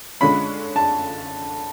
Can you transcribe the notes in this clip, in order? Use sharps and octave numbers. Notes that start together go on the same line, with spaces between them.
D3 G#3 C#4 F4 B5
A5